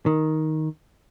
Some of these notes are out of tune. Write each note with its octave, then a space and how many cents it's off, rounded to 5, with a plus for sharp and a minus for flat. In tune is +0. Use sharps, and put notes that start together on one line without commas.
D#3 +5